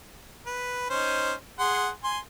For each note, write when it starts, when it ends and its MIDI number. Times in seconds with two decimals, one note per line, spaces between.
0.46 0.85 71
0.90 1.33 61
0.90 1.33 63
0.90 1.33 72
1.59 1.89 68
1.59 1.89 78
1.59 1.89 84
2.04 2.18 80
2.04 2.18 84